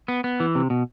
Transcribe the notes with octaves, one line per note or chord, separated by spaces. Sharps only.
B3
B3
E3
C3
B2